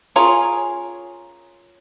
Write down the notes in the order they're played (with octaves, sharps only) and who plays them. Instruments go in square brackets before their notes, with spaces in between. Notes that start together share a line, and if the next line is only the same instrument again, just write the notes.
[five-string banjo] C#4 F4 G#4 A#4 C#5